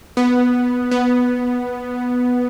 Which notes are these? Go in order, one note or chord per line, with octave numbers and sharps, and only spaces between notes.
B3
B3